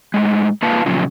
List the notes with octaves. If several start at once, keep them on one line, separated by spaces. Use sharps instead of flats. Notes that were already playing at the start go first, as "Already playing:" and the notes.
A2 G#3
A#3 F4 B4 F5 A5
A#2 C#3 F3 F#3